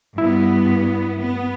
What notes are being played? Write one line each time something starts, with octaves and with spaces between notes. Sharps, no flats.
G2 B3 E4
B3